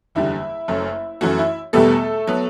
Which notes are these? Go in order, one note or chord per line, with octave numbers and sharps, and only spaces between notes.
F#1 E2 D3 G3 E4
F#1 F#2 F#3 A3
F#2 E3 A3 F#4
E4
E2 B2 G3 A3 B3 A4
F#3 B3